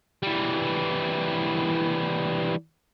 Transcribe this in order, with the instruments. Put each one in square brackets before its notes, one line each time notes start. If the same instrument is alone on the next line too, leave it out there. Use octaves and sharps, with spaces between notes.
[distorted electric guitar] E3 G3